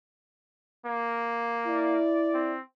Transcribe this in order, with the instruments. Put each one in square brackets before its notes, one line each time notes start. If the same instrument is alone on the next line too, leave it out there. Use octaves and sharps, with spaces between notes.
[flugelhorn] A#3
[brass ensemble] E4 D5
[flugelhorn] C4